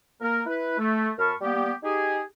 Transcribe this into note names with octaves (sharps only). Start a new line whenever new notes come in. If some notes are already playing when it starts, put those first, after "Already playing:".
A#3 A#4
E4 B4
A3
F#2 A#4 A5 B5 C#6 F6
G3 A#3 B3 G4
D#4 G4 G#4